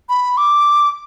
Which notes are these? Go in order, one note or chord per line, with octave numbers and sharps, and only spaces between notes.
B5
D6